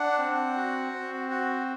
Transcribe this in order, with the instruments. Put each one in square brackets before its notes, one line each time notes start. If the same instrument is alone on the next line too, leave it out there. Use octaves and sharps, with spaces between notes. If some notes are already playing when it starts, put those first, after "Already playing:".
Already playing: [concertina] D4 F#5
C4
F#4
C4
F#4